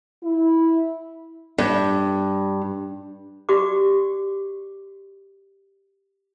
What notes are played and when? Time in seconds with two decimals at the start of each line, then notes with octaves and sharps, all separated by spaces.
0.23 E4
1.58 G2
3.49 F#4 G4 D5 D6